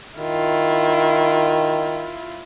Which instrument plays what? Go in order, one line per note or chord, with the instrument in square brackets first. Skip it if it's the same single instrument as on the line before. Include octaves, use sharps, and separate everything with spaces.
[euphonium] D#3 [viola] E4 F4